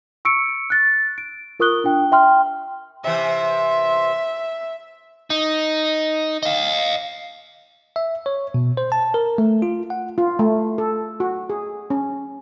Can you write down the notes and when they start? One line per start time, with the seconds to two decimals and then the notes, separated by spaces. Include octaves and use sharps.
0.25 C#6 E6 C#7 D7
0.70 F#6 A6
1.18 D7
1.60 F4 A#4 C#6 D#6 F#6 G7
1.84 D4 F4 G5
2.12 E5 G5 C6 F6
3.04 C3 E3 E5
5.30 D#4
6.43 D#5 F5
7.96 E5
8.26 C#5
8.54 B2
8.77 C5
8.92 A5
9.14 A#4
9.38 A3
9.62 F4
9.90 F#5
10.18 F4
10.39 A3
10.78 A4
11.20 F#4
11.50 G#4
11.90 C#4